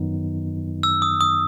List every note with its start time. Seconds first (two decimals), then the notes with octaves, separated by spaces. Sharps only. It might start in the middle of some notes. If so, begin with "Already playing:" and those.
Already playing: F#2 D#3 F#3 B3 D#4
0.83 E6
1.02 D#6
1.21 D#6